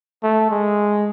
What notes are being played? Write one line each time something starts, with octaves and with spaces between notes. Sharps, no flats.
A3
G#3